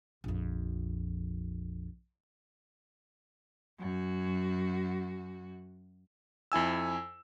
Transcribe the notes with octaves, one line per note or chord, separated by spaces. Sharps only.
A#1 F2
F#2 F#4
F2 E4 G#5 E6